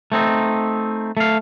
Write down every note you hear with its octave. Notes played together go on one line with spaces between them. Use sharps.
A3 C4 D#4
A3 F5